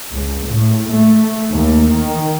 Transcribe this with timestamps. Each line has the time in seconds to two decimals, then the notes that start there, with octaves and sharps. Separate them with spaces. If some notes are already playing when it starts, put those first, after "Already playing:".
0.11 C#2
0.48 A2
0.90 A3
1.51 D#2
1.93 D#3